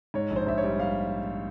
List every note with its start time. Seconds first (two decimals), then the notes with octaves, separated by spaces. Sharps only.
0.14 G#2 C#5
0.31 A#1
0.36 C5
0.46 A#1 E5
0.58 C#5
0.63 G3
0.79 G3 F5